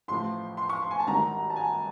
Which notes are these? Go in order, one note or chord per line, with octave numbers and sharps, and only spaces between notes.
A1 A2 F3 C6
C6
C#6
C6
G#5
A5
G#1 G2 D#3 A#5
A5
G#5